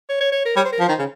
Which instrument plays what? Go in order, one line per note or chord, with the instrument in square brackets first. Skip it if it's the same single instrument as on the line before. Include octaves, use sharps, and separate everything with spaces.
[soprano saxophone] C#5
C#5
C#5
A#4
[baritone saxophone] G3 [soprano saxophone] C#5
[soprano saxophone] C5
A#4
[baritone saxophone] F3 [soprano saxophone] C5
[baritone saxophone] D#3
C#3